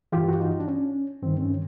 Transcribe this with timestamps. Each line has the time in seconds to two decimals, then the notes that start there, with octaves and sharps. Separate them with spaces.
0.12 G2 E3 F4 G4
0.28 F#4
0.40 D#4 F4
0.59 D4
0.68 C#4
1.22 G2 D#3 C4
1.40 C#4